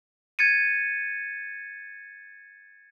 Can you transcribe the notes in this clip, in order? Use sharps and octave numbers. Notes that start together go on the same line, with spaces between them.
G#6 A6 C#7 D#7